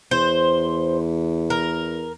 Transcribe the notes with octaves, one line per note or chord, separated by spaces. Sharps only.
E2 C5
A#4